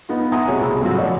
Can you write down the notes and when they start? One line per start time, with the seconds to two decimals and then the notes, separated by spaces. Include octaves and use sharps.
0.09 B3 D#4 F4
0.32 E5 F#5 G#5 A#5 C6 D#6
0.48 C3 F#4 G#4 C#5
0.61 C2 B2 G#4 B5 E6
0.81 A2 C#3 F#3 C4 F4 F#4
0.98 F1 F3 C#5 D5